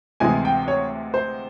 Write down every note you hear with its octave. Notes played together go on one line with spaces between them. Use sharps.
D2 C3 E3 G#3 G#5
G5
C#5
C5